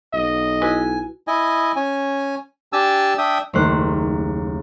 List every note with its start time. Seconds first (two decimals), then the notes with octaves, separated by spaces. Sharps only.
0.13 B1 D#5
0.62 E4 F#4 B4 G#5
1.28 E4 D#5 G#5
1.76 C#4 G#5
2.73 D4 G4 G#5 A5 E6
3.18 D4 E5 G5 D#6
3.53 F#1 D#2 A3 C5 F#6